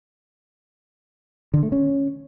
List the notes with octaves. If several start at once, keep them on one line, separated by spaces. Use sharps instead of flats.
D3
A3
C#4